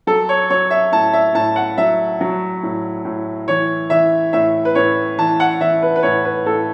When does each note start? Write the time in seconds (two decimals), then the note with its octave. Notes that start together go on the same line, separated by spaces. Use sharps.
0.07 F#3 A4
0.29 C#5
0.50 F#3 C#5
0.71 E5
0.92 A2 A5
1.13 E5
1.34 A2 A5
1.56 F#5
1.78 F#3 E5
2.21 F#3
2.63 A2
3.05 A2
3.48 E3 C#5
3.90 E3 E5
4.33 A2 E5
4.65 B4
4.75 A2 C#5
5.18 E3 A5
5.40 F#5
5.60 E3 E5
5.82 B4
5.96 B4
6.03 A2 C#5
6.25 B4
6.46 A2 A4